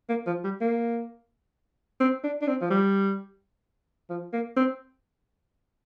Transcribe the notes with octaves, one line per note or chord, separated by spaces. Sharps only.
A#3
F3
G3
A#3
C4
D4
D4
C4
F3
G3
F3
A#3
C4